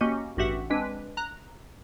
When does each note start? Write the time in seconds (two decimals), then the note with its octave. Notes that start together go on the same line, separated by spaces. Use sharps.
0.01 A#3 C#4 F#4 G4 D#5
0.37 A1 G2 F#4 G4 E5 F#5
0.70 G#3 C4 D4 B4
1.17 A#5 F#6